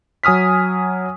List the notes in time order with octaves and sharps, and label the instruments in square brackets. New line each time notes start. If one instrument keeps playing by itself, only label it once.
[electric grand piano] F#3 G#5 D#6 F6 B6